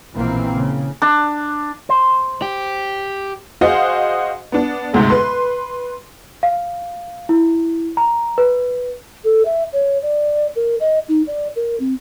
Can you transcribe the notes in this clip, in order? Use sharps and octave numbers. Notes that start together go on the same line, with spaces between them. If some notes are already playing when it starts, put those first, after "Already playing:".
A#1 B2 E3 A#3 C4
C#3
D4
C5
G4
F#4 G#4 C5 D#5 F5 F#5
B3 D4
G1 D2 G#2 C3
B4 C6
F5
E4
A#5
B4
A4
E5
C#5
D5
A#4
D#5
D#4
D5
A#4
C4